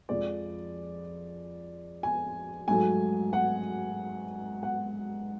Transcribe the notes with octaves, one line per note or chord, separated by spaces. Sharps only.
F2 F3 G#3 D5
G#5
G#2 F#3 A3 G#5
F#5
F#5